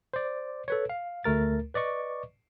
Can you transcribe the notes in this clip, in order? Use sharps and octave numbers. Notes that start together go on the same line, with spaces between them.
C5 D5
A4 B4 C#5
F5
D2 A3 A#4 A6
B4 D5 D#5 C#6